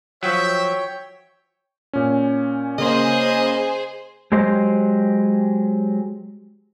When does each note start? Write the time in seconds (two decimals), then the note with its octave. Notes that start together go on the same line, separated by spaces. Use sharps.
0.23 F3 F#3 C#5 E5 G5
1.93 A#2 C#4
2.78 C#3 A#3 G#4 C5 D#5 C6
4.32 F#3 G#3 G4 C5 D#5